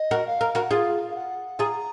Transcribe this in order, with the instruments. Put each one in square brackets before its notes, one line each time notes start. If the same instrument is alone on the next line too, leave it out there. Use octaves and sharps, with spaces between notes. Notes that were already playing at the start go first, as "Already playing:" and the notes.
Already playing: [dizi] D#5
[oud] F#4 A#4
[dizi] F5
[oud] A#4
F#4 A#4
[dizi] F#5
[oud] F4 G#4 [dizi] F5
[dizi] F5
F#5
[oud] F4 G#4 [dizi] A#5